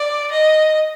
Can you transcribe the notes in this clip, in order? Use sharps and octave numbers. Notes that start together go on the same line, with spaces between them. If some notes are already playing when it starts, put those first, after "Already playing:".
Already playing: D5
D#5